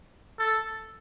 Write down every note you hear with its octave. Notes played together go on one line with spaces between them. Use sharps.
A4